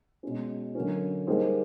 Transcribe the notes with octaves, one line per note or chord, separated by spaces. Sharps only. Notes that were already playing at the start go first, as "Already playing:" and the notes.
B2 G#3 C#4
D3 F#3 A#3 C#4
G3 A#3 D#4 G#4 C5